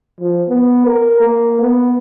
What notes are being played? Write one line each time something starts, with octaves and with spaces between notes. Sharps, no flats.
F3
B3
A#4
A#3
B3